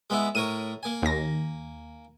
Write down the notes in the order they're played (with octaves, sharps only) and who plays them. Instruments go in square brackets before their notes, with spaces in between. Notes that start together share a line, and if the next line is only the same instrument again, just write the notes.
[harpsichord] G#3 B3 E4
[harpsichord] A2 A#4 C#5 [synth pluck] D#7
[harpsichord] A#3 G#5
[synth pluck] D#2 A#6